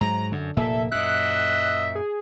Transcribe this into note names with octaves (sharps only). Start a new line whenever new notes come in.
G#2 F#3 A#5
F#2 D3
F1 A#2 A#3 A4 E5
F#2 A#2 D#5 E5 F#6
G#4